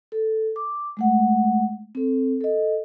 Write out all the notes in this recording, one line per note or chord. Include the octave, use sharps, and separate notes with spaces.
A4
D6
G#3 A3 F#5
C4 A4
A4 D#5